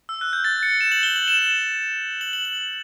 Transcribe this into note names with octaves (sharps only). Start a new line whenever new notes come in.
E6
F#6
G6
A6
C#7
E7
F#7
G7
F#7
E7
E7
F#7
F#7
F#7